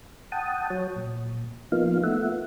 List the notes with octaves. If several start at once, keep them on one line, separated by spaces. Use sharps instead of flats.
F#5 G5 A5 D#6
F#3 C#5
A#2
F3 A#3 B3 D#4 F4 F5
A3 B3 F4 E5 F#5